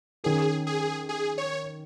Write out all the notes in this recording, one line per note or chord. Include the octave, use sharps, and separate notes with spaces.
D#3 C#4 G#4 A#4
G#4
G#4
C#5